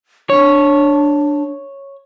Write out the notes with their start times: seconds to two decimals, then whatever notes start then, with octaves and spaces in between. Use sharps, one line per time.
0.30 D4 C#5